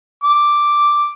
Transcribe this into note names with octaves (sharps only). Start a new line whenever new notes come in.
D6